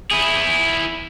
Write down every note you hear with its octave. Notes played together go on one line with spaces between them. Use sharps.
E4 G#4